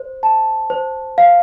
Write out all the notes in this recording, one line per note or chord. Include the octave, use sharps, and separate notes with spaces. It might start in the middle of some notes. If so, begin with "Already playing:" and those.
Already playing: C5
A5
C5
F5